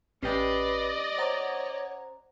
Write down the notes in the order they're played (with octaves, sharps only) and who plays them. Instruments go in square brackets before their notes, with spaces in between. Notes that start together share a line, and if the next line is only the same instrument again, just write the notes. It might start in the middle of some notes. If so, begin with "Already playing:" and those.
[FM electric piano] A1 C7 [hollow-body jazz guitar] C#4 G4 G5 [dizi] B4 [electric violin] D5 D#5
[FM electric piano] C5 F#5 A#5 [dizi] C#5